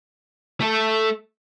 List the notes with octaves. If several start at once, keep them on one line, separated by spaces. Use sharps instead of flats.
A3 A4